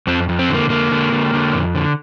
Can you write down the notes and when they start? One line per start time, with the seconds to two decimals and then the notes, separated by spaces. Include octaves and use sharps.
0.07 F2 C4
0.29 F2
0.39 C4
0.50 D3 A#3
0.70 D3 A#3
0.91 D3
1.12 D3
1.34 D3
1.54 F2
1.75 D3